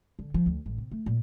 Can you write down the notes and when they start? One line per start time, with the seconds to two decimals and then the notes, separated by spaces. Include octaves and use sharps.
0.19 D3
0.34 F3
0.46 D2
0.66 A1
0.78 C3
0.91 A3
1.06 A#2